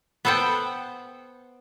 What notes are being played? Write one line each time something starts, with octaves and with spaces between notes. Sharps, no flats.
B3 A4 C5 F#5 G5